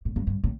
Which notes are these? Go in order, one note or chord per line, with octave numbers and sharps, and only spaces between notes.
A2
G2
G2
A2